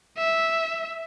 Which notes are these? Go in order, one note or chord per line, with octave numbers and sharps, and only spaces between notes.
E5